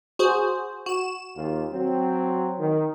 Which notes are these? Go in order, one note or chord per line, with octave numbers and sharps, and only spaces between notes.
F#4 G#4 C5
F#4 E7
D#2 F4
F#3 C4
D#3